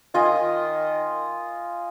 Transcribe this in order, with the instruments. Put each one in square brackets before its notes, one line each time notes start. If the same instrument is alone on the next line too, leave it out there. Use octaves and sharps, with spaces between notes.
[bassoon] D#3 [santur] F4 D#5 G#5